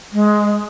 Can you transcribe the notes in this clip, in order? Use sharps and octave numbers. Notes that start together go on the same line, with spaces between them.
G#3